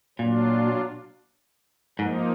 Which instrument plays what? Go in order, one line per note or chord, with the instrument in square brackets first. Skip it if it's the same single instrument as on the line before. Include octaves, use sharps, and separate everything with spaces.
[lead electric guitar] A#2 [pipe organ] F#3 D4 F4
[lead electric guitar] G#2 [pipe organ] F3 A#3 D#4